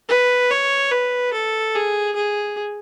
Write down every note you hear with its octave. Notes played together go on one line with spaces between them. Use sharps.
B4
C#5
B4
A4
G#4
G#4